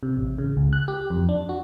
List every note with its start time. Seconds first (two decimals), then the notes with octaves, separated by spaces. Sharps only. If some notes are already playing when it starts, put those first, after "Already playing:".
0.03 C3
0.17 A1
0.38 C#3
0.57 C#2
0.73 F#6
0.88 G4
1.10 F2
1.29 D4
1.49 F#4